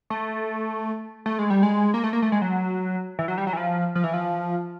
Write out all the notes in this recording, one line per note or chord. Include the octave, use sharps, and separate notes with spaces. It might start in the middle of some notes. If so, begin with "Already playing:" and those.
A3
A3
G#3
G3
G#3
A#3
A3
A#3
A3
G#3
F#3
E3
F#3
G3
F#3
E3
F3
F3
E3
F3